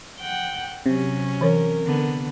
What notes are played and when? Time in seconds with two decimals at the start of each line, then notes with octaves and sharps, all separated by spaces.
0.20 F#5 G5
0.86 C3 F#3 C#4
1.41 E3 A#4 C#5
1.86 D3 B3